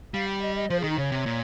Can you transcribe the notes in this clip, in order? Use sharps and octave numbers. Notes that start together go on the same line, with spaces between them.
G3 F5
G5
D#5
D#5
F3 C5
D#3 G#4
D#4
C#3 C#5
C3
A#2